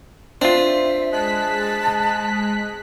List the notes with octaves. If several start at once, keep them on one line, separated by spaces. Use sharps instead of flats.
C4 D4 F4 E5
G#3 A5 F#6 B6